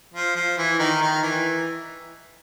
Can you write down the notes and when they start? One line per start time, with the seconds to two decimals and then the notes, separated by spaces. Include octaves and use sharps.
0.14 F3
0.36 F3
0.58 E3
0.79 D#3
1.01 D#3
1.23 E3